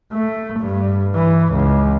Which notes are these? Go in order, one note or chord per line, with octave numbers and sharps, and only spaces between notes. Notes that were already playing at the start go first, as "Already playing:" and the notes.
A3
G2
E3
C#2